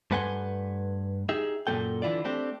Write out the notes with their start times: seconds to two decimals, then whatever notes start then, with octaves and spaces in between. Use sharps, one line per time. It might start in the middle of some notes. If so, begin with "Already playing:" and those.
0.11 G2 A3 B4 F#5 G#5 C6
1.29 D#4 G4 G#4 E5
1.67 F#2 A#2 G#3 A3 A4 G5
2.02 D3 E3 E4 F4 D5
2.25 A3 C4 D4 G4